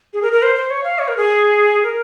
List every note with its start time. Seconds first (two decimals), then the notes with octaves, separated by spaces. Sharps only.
0.13 G#4
0.22 A#4
0.33 A#4
0.42 C5
0.56 C5
0.70 C#5
0.84 F5
0.99 C#5
1.08 A#4
1.17 G#4
1.83 A#4